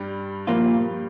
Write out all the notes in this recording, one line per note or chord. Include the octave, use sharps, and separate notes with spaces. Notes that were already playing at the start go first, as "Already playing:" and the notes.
Already playing: G2 G3
A#2 F3 A#3 F4